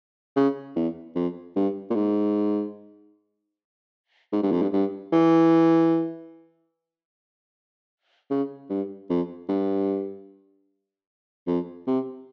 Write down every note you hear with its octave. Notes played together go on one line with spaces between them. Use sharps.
C#3
E2
F2
G2
A#2
G#2
G#2
G2
F2
G2
G2
E3
C#3
G2
F2
G2
F2
C3